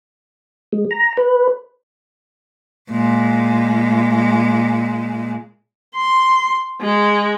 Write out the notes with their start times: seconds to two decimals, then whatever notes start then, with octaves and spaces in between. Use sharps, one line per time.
0.72 G#3
0.91 A#5
1.17 B4
2.91 A#2 G#3
5.95 C6
6.81 G#3